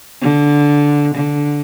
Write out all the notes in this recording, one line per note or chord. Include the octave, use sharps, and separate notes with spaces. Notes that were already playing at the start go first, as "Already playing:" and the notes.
D3
D3